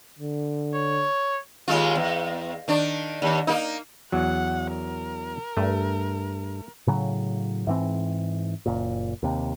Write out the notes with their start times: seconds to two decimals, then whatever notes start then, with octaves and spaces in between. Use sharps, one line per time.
0.19 D3
0.74 C#5
1.68 D#2 G#3 F4
1.96 E2
2.68 D#3 D4
3.22 D#2
3.47 A#3 D#4
4.12 E2 F#3 F#5
4.74 A#4
5.57 G2 A3
6.87 A2 C#3 F#3
7.67 G#2 E3 C4
8.66 F#1 A#2
9.23 D#2 C3